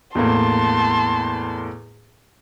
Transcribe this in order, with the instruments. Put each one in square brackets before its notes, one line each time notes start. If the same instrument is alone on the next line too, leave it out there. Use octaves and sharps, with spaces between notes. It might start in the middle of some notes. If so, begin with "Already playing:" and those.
[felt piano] E2 A2 A#3 [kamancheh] A5 C6